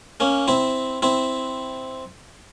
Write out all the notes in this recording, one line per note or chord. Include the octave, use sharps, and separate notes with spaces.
A#3 C#4
C4 E4
C4 E4